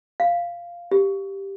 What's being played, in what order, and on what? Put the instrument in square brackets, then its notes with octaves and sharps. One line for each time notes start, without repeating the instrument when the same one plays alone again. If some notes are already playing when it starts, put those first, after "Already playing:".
[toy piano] F5
G4